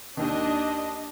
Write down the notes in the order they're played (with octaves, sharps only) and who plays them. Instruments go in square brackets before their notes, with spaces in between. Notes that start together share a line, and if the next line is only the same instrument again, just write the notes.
[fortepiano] D#2 D#3 [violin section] D4 D#5